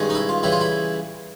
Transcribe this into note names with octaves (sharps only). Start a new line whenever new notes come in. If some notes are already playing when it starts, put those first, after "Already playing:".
Already playing: G2 D#3 G#3 C#4
D#4
E4
F4
C#3 E3 G3 E4
F4
E4